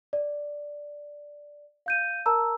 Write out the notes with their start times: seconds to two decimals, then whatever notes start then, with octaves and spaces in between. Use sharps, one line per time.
0.13 D5
1.86 F5 G6 D#7
2.26 A#4 A5 A#5 E6